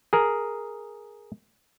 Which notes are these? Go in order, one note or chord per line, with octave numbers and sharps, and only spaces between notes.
G#4 A#4